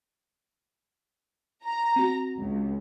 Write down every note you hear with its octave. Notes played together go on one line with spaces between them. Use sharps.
A#5
C4 F#4
C#2